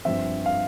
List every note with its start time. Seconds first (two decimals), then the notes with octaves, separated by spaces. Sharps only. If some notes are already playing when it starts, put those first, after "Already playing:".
0.05 G2 F3 C4 E5
0.46 F5